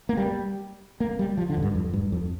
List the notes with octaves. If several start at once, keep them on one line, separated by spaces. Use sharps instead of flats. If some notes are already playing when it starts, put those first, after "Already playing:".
A#3
G3
A#3
G3
F3
D3
F2
G2
F2
G2
F2